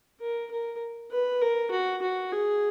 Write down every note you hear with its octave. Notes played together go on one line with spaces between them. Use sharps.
A#4
A#4
B4
A#4
F#4
F#4
G#4